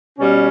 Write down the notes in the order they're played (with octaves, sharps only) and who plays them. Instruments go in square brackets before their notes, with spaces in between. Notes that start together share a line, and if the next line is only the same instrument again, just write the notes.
[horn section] B2 G3 C#4